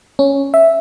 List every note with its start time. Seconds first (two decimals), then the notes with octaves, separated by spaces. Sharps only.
0.19 C#4
0.54 E5